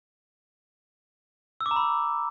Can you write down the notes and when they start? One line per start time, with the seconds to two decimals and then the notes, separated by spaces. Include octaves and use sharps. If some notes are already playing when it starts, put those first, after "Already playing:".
1.61 E6
1.66 D6
1.71 A#5
1.76 B5